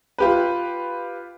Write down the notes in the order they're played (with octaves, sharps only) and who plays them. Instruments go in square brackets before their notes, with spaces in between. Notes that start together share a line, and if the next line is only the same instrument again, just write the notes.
[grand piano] F4 G4 B4